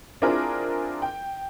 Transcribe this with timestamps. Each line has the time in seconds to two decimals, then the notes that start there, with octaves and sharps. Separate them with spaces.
0.22 C4 D4 E4 F4 G#4 A#4
1.02 G5